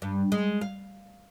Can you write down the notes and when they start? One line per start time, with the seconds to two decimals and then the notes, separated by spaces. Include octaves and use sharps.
0.02 G2
0.32 G#3
0.61 F5